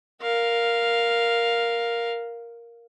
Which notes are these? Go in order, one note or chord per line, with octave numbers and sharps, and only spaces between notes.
A#4 F5